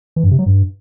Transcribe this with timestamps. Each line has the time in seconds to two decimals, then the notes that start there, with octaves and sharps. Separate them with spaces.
0.16 E3
0.24 G2
0.31 C3
0.39 F#3
0.46 G2